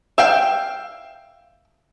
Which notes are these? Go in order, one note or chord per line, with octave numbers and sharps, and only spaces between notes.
E5 F5 G5